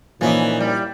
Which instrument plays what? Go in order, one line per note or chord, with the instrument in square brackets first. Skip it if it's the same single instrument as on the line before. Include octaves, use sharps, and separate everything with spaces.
[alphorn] A#2 [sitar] E3 [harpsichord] F3 C#4 D#4 [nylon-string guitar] A#3 E4
[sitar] G3